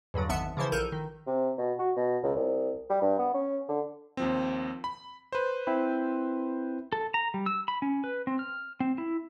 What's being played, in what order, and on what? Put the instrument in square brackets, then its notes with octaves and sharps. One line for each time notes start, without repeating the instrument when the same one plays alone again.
[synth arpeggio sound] E2 G2 D3 F#3
G#1 B3 E5 A5 C#7
C#3 E3 F3 E4 C5
A#1 A4 A#4 G6 D#7
D#3
[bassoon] C3
B2
F#4
B2
C#2
C2
G3
G2
B3
C#4
D3
[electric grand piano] D#2 F3 C4
B5
B4 C5
[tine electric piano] C4 E4 B5
[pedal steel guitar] A4
A#5
G3
E6
B5
C#4
B4
C4
F6
C4
E4